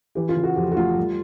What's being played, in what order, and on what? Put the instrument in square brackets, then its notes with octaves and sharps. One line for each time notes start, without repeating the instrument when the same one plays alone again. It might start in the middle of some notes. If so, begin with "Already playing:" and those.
[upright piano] E3 G4
F4
C#3
F#4
F2 G4
F#4
A3 F4
G3